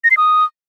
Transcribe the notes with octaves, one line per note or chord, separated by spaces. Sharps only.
A#6
C7
D#6